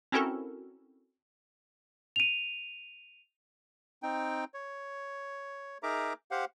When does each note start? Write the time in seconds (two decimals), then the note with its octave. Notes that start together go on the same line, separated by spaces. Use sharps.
0.12 C4 C#4 E4 F#4 A4 A#4
2.16 D#7 F7
4.03 C4 D#4 G5
4.54 C#5
5.83 D#4 G#4 A#4 E5 A#5 D6
6.31 G4 C5 F5 F#5